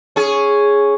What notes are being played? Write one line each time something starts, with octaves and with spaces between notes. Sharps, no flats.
C#4 G#4